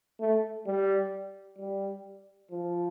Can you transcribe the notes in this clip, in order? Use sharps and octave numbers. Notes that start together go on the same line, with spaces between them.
A3
G3
G3
F3